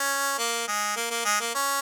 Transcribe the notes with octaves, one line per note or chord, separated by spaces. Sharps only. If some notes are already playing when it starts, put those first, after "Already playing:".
Already playing: C#4
A#3
G#3
A#3
A#3
G#3
A#3
C#4